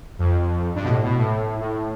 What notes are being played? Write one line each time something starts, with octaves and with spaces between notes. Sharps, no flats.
F2
G2
B2
A2
B2
A2
A2